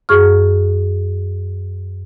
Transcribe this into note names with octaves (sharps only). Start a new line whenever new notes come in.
F#2 G#4 C#6 F6